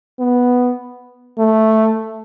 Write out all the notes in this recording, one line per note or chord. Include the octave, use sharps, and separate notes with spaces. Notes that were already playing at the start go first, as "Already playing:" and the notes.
B3
A3